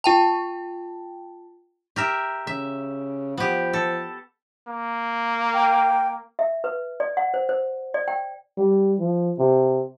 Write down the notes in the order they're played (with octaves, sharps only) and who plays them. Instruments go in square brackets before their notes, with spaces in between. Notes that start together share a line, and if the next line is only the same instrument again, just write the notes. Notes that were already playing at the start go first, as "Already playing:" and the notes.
[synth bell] F4 G5 A5
[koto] G4 A#4 E5
[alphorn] C#3 [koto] E5
[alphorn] F3 [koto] B3 G4
[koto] A4
[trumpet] A#3
[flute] G5
[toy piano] E5
B4
D5
F#5
C5
C5
D5
G5
[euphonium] G3
F3
C3